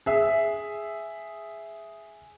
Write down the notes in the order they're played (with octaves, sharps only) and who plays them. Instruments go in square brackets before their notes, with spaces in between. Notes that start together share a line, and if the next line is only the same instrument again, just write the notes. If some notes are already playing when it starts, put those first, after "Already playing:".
[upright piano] G#4 E5